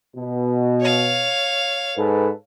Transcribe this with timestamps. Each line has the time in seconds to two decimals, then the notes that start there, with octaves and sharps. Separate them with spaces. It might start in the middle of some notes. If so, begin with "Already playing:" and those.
0.16 B2
0.80 C#5 F5
1.97 G#2 A4 B4